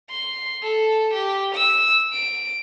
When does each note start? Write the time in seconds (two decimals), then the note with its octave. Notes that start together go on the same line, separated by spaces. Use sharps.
0.10 C6
0.63 A4
1.14 G4
1.55 E6
2.13 D7